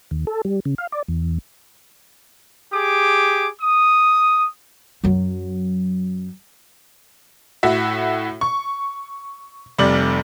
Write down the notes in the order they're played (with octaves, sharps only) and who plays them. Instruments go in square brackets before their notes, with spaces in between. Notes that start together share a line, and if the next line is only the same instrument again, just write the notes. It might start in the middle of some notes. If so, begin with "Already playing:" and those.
[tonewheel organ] D#2
A4
G3
C#3
F5
D5
E2
[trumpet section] G4 G#4 D6
D#6
[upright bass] F#2 F#3
[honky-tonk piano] A2 F#4 E5
C#6
F1 C3 G3 D6 F#7